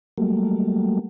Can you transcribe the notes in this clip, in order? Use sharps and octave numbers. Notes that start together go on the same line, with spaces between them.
F#3 G3 A3 A#3